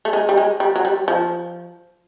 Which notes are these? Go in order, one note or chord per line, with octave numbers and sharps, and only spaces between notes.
A3
G#3
G3
G#3
G3
F#3
G3
F3